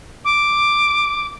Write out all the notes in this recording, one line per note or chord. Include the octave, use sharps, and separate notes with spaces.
D6